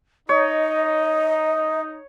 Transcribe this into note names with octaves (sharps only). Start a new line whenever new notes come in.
D#4 C#5 D#5